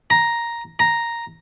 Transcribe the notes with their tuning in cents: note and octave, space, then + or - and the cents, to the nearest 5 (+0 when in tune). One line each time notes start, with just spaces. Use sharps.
A#5 +5
A#5 +0